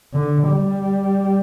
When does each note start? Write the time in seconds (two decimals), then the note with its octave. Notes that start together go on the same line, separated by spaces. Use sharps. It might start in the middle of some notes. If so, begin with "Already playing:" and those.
0.14 D3
0.49 G3